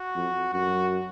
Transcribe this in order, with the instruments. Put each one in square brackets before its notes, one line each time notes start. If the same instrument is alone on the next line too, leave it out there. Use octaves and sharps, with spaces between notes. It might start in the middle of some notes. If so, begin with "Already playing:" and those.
Already playing: [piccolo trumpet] F#4
[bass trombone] F2
[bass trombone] F#2 [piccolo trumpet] F#4